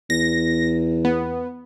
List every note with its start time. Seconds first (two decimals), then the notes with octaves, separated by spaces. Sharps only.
0.10 E2 A#6
1.05 B3